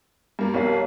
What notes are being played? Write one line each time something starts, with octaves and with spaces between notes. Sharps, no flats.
G2 A#3
B1 F2 G3 A#4 C#5 F5